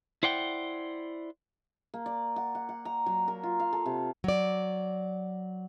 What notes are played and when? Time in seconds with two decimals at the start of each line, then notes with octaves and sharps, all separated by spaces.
0.23 E4 C5 D5 F#5 G5
1.94 A#3
2.06 D5
2.36 F#5
2.55 F#5
2.69 F#5
2.85 A#5
3.06 F#3
3.28 A#4
3.43 F4
3.60 F5
3.73 A4
3.86 C3
4.24 F#3 D5